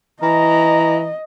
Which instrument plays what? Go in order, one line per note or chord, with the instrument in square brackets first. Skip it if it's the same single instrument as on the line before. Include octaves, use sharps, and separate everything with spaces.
[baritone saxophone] E3 [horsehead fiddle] D#5 [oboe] A#5